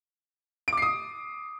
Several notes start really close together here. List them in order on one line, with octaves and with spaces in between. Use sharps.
D7 D6 C7 D#6